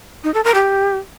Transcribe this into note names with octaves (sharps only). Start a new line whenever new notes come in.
D#4
A4
A#4
G4